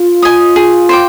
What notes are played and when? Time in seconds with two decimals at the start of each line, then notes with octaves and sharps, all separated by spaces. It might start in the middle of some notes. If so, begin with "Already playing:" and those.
Already playing: F4
0.22 D#5 G#5 D#6
0.56 G#4
0.89 C5 G5 D6